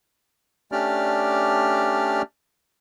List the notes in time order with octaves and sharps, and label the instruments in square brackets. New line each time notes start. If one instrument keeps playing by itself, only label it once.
[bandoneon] A3 C#4 D4 G4 D5 F6